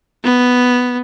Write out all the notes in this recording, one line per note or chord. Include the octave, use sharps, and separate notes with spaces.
B3